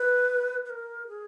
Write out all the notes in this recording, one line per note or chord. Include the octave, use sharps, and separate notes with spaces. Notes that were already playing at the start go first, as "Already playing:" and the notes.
Already playing: B4
B4
A#4
G#4